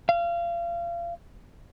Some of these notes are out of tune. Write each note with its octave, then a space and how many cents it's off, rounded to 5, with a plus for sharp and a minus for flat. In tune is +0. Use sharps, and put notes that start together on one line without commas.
F5 -30